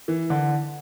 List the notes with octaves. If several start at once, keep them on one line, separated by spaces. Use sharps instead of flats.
E3
D3